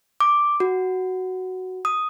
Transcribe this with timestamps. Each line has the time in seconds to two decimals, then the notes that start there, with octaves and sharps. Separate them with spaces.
0.20 D6
0.60 F#4
1.85 D#6